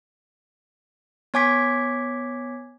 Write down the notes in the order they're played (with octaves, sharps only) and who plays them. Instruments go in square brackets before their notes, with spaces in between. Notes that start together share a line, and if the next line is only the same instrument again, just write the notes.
[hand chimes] B3 C#5 G#5 D6 G#6 B6